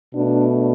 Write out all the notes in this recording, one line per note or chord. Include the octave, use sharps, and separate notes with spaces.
B2 A3 D4